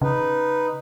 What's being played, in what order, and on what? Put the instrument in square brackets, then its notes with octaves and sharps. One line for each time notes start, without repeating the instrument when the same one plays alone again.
[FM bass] C#3 [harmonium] D#4 B4